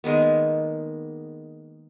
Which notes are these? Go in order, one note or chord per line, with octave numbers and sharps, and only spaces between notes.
D#3 G#3 A#3 B3